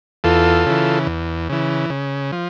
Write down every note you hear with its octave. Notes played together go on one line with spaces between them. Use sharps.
E2 F4 A4
C#3 E3
E2
C#3 E3
C#3
F3